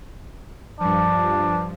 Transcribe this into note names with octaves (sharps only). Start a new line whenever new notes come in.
G2 F3 D4